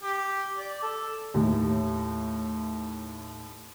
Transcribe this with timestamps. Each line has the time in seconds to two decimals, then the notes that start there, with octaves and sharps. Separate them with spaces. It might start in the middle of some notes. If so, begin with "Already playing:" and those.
0.03 G4
0.58 D5
0.83 A4
1.34 D#2 A2